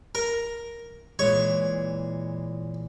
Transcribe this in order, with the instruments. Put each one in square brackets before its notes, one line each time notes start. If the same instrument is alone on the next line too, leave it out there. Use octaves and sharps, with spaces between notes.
[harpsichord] A#4
[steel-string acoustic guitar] A#2 E3 G#3 [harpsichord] C#5